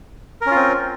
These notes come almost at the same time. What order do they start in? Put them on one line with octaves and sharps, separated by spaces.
A#4 C#4 F4 C4